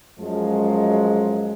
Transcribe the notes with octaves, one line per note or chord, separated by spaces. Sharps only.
F#2 F3 G#3